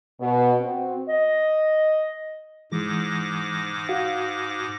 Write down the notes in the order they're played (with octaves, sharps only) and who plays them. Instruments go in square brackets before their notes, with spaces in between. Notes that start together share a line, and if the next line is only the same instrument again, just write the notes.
[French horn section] B2
C4 F#4
[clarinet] D#5
[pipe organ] G#2 D6 A#6 [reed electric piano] E3 G#3
[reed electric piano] F#4 F5